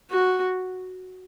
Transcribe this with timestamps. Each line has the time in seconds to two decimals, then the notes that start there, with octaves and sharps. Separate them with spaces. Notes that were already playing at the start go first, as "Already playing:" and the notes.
0.10 F#4